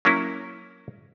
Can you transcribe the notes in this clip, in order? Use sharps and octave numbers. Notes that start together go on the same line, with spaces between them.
F#3 A#3 C#4 E4